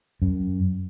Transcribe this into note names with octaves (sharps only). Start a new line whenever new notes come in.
F#2